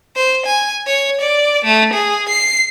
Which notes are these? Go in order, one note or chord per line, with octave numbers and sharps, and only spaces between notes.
C5
G#5
C#5
D5
A3
G#4
C7